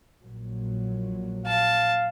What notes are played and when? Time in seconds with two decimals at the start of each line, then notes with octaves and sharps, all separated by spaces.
0.22 A#1 A#2 F#3
1.47 F5 A5